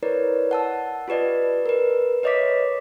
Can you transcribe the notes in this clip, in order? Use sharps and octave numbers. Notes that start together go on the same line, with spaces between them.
E4 A#4 B4 C#5 D5
F#5 A5 E6
F4 G4 B4 D5 D#5
A#4 B4
B4 C#5 D#5 E5 D6 B6